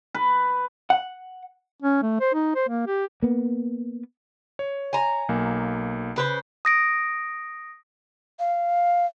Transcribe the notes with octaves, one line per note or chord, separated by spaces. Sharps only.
B4
F#5
C#4
A3
C5
D#4
C5
A#3
G4
A#3 B3
C#5
G#5 A#5
B1 A#3
C#3 B4 C5
D#6 A#6 D7
F5